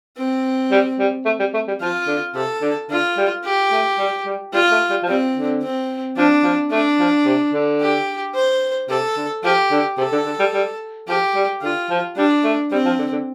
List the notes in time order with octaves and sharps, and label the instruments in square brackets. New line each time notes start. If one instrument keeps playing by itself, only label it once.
[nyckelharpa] C4
[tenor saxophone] G3
G3
A3
G3
A3
G3
[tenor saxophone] F3 [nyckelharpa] F4
[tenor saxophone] D3
[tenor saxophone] C3 [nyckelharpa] A4
[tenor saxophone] D3
[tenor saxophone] D3 [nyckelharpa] F4
[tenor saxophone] G3
[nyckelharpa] G4
[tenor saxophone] A3
G3
G3
[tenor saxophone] G3 [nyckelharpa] F4
[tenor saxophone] A3
G3
F3
[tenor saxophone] G3 [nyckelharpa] C4
[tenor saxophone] D3
[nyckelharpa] C4
[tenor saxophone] F3 [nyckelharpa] D4
[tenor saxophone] F3
[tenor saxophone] A3 [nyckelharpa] D4
[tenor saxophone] F3
C3
D3
[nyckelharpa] G4
C5
[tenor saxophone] C3 [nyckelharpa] A4
[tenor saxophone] D3
[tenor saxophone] F3 [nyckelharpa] G4
[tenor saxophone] D3
[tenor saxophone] C3 [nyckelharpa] A4
[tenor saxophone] D3
D3
G3
G3
[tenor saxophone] F3 [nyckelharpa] G4
[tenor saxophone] G3
[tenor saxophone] D3 [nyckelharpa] F4
[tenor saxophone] F3
[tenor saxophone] G3 [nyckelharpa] D4
[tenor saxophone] A3
[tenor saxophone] G3 [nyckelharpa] C4
[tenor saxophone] F3
D3
D3